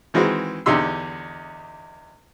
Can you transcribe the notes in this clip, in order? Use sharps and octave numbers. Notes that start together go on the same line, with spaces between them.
D#3 E3 G#3 C4 F#4
E2 D3 D#4 G4 C6 E6